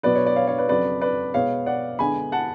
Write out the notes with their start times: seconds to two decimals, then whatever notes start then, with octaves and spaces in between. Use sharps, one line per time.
0.03 B2 F#3 B3 B4 D5
0.15 C#5
0.26 D5
0.36 C#5 F5
0.47 C#5 F5
0.58 B4 D5
0.69 F2 C#3 F#3 B4 D5
1.01 B4 D5
1.34 B2 G#3 B3 C#5 F5
1.66 D5 F#5
1.99 D2 D3 G#3 B3 G#5 B5
2.32 F#5 A5